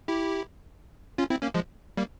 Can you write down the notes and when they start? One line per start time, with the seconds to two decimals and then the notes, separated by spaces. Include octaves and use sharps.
0.08 E4 G4
1.18 C#4 F4
1.30 C4 E4
1.42 A#3 C#4
1.54 F3 G#3
1.97 G3 A#3